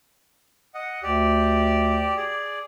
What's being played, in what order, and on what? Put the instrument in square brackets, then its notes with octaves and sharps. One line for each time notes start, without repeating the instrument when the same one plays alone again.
[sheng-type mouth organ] D#5 F#5
[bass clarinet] D2 [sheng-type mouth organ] G4 D5
[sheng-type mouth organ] G#4 D5